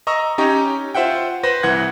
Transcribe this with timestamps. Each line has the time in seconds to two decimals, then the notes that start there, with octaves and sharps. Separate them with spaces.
0.07 D#5 A#5 C#6 E6
0.38 C#4 D#4 G4 C#5 D#5 A#5
0.94 F4 C5 E5 F#5 G5
1.43 B4 C5 B5 A#6
1.63 C2 E3 F#5 F#6 G#6